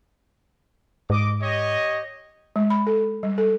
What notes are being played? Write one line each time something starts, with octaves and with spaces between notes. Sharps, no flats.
G#2 D#5 D6
G4 C#5 D#5
G#3
B5
A4
G3
A4